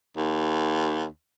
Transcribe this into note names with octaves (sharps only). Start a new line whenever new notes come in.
D#2